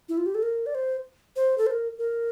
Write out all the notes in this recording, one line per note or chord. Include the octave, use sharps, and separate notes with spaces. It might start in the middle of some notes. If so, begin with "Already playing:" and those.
E4
F4
G4
A4
A#4
D5
C5
C5
A4
C5
A#4
A#4